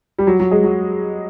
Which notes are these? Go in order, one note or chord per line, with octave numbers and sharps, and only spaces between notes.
G3
F#3
F#3
G#3
F#3